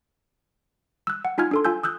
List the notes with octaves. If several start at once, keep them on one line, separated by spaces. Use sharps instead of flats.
E6 F#6
F#5
D#4 F4 G#5 F6 G#6
D4 A4 C6
F4 G#5 E6 G6
D#6 E6 F#6 G6